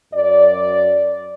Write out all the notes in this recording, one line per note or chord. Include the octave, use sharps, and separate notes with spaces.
F#2 F#3 D5